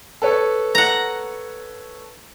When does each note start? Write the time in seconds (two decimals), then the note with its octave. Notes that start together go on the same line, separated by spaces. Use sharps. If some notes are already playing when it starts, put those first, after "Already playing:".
0.22 A4 B4 C#5
0.75 F#5 A#5